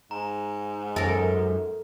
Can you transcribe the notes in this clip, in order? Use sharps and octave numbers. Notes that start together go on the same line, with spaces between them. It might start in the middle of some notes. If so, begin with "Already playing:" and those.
G#2 A#5
F#2 A4 A#4